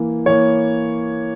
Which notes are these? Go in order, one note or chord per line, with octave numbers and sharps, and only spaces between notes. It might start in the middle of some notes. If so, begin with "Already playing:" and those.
Already playing: E3 A#3
E3 A#3 C#5